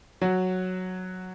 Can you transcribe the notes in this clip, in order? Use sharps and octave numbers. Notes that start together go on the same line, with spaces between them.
F#3 F#4